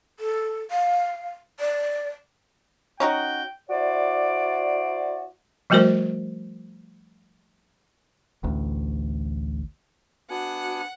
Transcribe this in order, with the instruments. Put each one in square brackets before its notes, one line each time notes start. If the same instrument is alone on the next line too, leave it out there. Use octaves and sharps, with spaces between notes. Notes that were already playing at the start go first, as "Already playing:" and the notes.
[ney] A4
F5
D5
[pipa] C#4 D#4 F#4 [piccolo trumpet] G5
[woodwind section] E4 F#4 C5 D5
[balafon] F3 G3 A3 F#4 A#4 C5
[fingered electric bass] A1 D2
[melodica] B3 D4 G#5 [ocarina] F#4 [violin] F#5